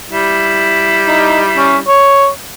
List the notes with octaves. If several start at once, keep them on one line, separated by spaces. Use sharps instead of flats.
G3 E4
D#4
C#4
C#5